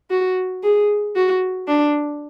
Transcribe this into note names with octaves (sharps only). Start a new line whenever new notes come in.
F#4
G#4
F#4
D4